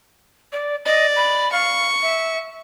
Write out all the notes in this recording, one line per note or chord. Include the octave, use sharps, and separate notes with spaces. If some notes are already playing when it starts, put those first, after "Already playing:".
D5
D5 D#5
B5
F5 C#6
E5